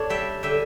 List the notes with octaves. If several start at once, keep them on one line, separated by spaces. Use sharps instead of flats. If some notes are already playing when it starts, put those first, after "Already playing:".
Already playing: D4 A4 C#5
G3 E5 G5
D3 E5 G5